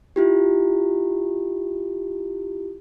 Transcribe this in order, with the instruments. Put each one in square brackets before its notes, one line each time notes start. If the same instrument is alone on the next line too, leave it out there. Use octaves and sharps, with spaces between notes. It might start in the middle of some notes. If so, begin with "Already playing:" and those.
[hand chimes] E4 F4 G4